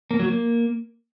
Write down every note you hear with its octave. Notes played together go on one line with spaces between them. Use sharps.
A#3
F#3
A#3